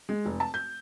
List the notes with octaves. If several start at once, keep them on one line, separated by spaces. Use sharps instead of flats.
G#3
F1
A5
G6